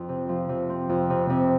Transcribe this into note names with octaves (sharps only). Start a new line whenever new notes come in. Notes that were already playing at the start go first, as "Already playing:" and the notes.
Already playing: F2
C3
F3
C3
C4
F2
C3
C3